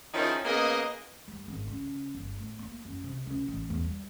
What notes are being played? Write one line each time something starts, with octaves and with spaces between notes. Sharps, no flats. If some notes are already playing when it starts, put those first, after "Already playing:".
D#3 F3 C#4 D#4 E4 G#4
C#3 A#3 B3 G#4 D#5
G2
G#1
C#3
G1
A2
A#3
F#2
C3
C#2
A1
E2
G3